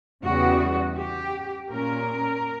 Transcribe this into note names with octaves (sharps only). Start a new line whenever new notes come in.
E2 C#3 G3 B3 F#4
G4
A#2 A#3 C#4 A#4